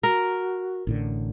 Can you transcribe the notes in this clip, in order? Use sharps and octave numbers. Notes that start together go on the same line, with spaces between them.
F#4 A#4
A1 A2 D3